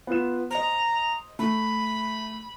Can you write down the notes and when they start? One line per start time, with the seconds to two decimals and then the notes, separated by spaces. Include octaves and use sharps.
0.07 B3 F4 E7
0.51 C5 D#5 A#5
1.39 A3 B5